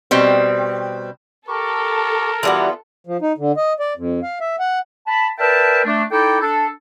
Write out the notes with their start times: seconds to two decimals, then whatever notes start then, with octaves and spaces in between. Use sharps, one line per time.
0.11 B2 G3 C4
1.48 G4 A4 A#4 C#6
2.43 E3 G3 B3 F4 F#4
3.07 F3
3.21 D#4
3.38 D3
3.57 D#5
3.80 D5
3.97 F2
4.23 F5
4.41 E5
4.59 F#5
5.07 A5 B5
5.39 A#4 B4 D5 E5 G5 A5
5.85 A3 D4
6.10 D#4 E4 A4 D5 G5
6.41 D4 A4